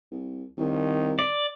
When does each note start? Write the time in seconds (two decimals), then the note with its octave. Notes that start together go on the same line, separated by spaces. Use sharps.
0.11 C2
0.58 C2 D#3
1.19 D5